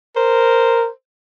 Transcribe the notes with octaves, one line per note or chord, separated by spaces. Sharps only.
A#4 C5